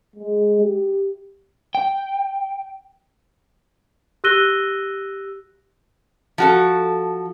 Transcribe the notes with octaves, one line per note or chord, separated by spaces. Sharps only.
G#3
G4
G5
G4 E6 F#6 A#6 D#7 G7
F3 F#4 A4